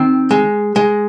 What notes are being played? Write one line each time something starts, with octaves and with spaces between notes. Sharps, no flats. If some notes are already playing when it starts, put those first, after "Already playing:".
Already playing: D#3 C4
G#3
G#3